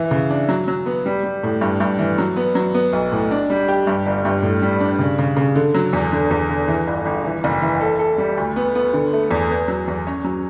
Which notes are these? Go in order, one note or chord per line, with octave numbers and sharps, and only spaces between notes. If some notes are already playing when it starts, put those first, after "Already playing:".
Already playing: E3 E4
C#3
D4
F#3
F#3
B3
G3
G3
A2
G2
G2
E3
F#3
B3
F#3
B3
B1
A2
D4
G3
G4
G2
G1
G2
A2
G3
D4
C#3
C#3
C#3
D3
F#3
E2
D3
E2
D3
E3
G1
G1
E3
F#1
E3
A4
A4
G3
D2
B3
B3
D3
A3
E2
B3
F#3
E2
C#4
F#3